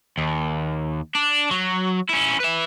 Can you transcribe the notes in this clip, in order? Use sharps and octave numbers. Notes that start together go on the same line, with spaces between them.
D#2
D4
F#3
C#4 E4
B4 E5